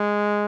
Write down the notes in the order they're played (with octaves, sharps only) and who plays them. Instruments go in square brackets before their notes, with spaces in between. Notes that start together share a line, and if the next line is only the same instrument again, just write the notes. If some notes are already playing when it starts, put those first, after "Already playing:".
Already playing: [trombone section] G#3